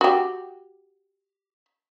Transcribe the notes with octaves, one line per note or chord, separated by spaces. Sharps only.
F#4 G4